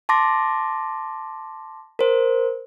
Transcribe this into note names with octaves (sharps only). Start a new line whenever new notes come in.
A5 C6 D6 A#6
A#4 C5